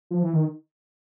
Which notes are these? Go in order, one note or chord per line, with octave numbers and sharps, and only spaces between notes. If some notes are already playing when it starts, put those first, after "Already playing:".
F3
E3
D#3